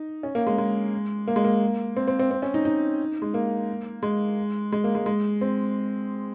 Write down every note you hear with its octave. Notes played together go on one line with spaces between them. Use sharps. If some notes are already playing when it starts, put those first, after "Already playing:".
Already playing: D#4
C#4
A#3
G#3
G#3
A#3
G#3
A#3
C4
C4
C4
C4
C#4
D#4
D#4
G#3
A#3
G#3
G#3
A#3
G#3
G#3
C4